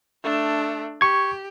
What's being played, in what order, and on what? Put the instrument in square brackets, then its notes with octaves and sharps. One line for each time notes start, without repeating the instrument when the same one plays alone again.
[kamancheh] A3 D4
[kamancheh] G4 [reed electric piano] C#6 G#6